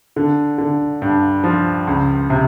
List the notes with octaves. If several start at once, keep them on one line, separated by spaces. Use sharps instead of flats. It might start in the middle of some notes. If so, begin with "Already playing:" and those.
D3
D3
G2
F3
C#2
C3